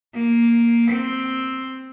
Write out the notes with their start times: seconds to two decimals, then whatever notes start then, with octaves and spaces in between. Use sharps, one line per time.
0.13 A#3
0.91 C4